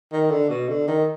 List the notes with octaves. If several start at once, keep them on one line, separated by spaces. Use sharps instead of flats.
D#3
D3
B2
D3
D#3